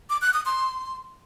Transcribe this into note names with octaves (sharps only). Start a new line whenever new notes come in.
D6
F#6
D#6
C6